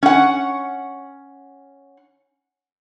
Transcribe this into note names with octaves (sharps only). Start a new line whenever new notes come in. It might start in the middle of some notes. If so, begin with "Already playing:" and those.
C#4 F#5